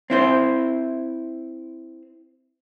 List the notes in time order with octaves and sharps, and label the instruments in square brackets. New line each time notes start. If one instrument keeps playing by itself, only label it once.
[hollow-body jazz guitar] C4 E4 C5